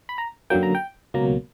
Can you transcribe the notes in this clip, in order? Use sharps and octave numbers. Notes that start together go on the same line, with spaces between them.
B5
A#5
F#2 D3 F#3 A#3 G5
A#5
G5
C#2 B2 F#3 A#3 A#5